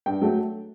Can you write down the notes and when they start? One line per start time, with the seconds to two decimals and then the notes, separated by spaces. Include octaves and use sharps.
0.06 G2 G5
0.21 F#3 A3